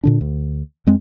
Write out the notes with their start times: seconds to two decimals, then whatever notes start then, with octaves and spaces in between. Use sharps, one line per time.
0.04 A#2 D3 D4
0.21 D2
0.87 F2 G#3 C4